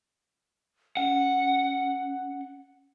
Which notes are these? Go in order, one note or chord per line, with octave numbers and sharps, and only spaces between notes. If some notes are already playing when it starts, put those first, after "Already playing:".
C#4 F#5